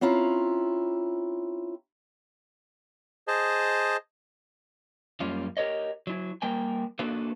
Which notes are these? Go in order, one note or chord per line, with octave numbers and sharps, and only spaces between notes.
C4 C#4 E4 F4 A#5
G#4 C5 D#5 A5
F#2 G3 A#3 C#4 F4
G4 A#4 C#5 D#5
F#3 E4
G3 A#3 A#4 G5 G#5
A#3 D4 F#4 A4 B4 F5